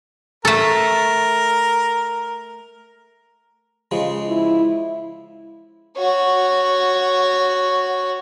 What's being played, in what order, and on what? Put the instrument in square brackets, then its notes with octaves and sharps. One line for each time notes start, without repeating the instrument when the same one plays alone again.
[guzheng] A3 A4 [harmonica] A#4
[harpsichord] C#3 F3 G#3
[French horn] E4
[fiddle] F#4 C#5